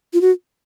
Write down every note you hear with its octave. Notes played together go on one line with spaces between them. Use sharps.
F4
F#4